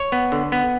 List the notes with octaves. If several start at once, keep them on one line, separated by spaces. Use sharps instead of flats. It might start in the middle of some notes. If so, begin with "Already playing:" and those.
Already playing: C#5
B3
D3
B3